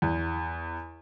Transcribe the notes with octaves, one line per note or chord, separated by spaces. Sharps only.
E2